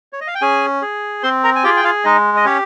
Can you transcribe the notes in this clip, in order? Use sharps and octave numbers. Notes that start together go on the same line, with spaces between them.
C#5
D#5
F5
G5
C#4 G#4 G#5
G#4
C4 C5 C6
A#4 A#5
G#5
F4 G4 G#4 G5
G5
F4 F5
G#3 D#4 D#5
D#5
C#4 G4 C#5